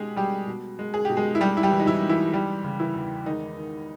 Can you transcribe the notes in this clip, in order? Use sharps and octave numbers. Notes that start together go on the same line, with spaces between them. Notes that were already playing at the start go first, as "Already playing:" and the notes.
Already playing: B2 G#3 G4 G#4
B2 G3 G4
B2
G#3
G#4
B2 G4
G#3 G#4
E4
G3 G#3 G4
E4
G3 G4
E3
D#4
E3 E4
G#2
E3 E4
E3 G3 G4
C#3
E3 E4
E2
D#3 G#3 D#4
D#3